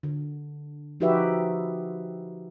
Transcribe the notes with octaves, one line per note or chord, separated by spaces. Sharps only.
D3
F3 D#4 F#4 G4 B4 E5